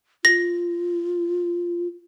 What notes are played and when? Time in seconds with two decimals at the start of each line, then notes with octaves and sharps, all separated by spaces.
0.25 F4 A#6